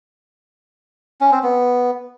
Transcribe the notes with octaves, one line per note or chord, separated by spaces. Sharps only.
C#4
C4
B3